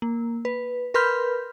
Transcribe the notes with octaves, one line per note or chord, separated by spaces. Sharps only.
A#3
B4
A#4 B4 B5 C6 F6 G6